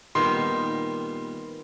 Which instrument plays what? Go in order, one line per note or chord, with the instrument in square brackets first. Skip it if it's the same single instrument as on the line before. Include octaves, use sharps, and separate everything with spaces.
[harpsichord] A#2 G3 B3 [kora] D#3 [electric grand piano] C6